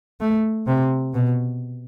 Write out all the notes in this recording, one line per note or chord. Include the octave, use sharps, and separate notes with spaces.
A3
C3
B2